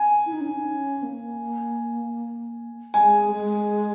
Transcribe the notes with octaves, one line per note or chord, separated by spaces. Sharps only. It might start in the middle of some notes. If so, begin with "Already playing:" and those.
Already playing: G#5
E4
D#4
C#4
D#4
C#4
A#3
G#3 G#5
G#3